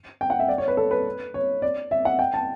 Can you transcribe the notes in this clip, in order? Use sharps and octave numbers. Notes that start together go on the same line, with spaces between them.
G5
F#5
E5
D5
C#5
B4
A4
B4
C#5
D5
E5
F#5
G5
A5